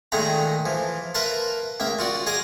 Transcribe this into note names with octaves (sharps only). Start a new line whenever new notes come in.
A#2 D#3 G#3 A3 F5 A#5
E3 F3
A#4 B4 E5 F5 A5 C6
C#2 A#3 E5
F4 F#4 D5
G#4 D#5 F5 D6 D#6